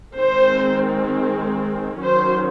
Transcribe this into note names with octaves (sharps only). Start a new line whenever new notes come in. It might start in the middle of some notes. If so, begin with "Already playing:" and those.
D#3 G#3 C4 C5
D#3 F#3 C#4 C5